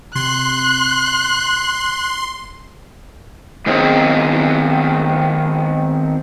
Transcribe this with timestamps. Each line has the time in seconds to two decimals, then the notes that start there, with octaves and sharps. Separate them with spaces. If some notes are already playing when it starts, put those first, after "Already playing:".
0.15 C3 C6 F#6
3.66 D#3 B3 C4 G#4 C#5